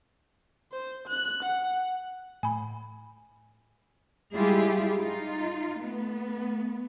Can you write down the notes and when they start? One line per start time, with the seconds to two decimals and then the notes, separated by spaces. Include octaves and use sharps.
0.72 C5
1.07 F#6
1.43 F#5
2.43 A2 G#5 B5
4.34 G3 G#3 E4 F4 G4 G#4
4.97 D#4 F4
5.80 A3 B3